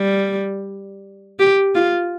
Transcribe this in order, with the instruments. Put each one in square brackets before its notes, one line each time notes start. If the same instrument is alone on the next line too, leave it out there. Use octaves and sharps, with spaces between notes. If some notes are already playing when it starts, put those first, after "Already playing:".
Already playing: [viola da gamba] G3
G4
F4